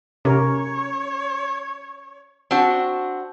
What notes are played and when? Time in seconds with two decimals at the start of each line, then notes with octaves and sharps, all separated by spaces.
0.25 C3 C#4 A#4 C#5
2.51 C4 D4 F#4